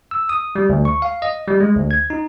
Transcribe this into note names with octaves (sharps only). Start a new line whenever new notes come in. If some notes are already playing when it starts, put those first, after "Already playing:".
E6
D#6
G3
D2
C#6
F5
D#5
G3
G#3
D2
G#6
D#4